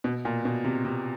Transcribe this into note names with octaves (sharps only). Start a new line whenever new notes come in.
B2
A#2
B2
C3
C3